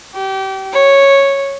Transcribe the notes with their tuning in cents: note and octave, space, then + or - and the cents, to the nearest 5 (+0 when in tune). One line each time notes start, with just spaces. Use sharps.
G4 -30
C#5 -5